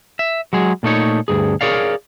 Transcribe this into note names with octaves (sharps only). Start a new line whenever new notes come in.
E5
F#3 G#3 G#4
A#2 A3 D#4 C#5
D2 G2 G#4
G#4 A#4 C#5 D5 F5